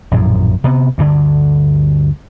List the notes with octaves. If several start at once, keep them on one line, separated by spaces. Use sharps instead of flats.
A#1 F#2 A2
C3 B3
D2 G2 D3